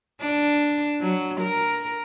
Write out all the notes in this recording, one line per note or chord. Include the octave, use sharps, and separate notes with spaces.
D4
F#3
A#4